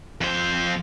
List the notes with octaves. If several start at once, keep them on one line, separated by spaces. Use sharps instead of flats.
F2 C5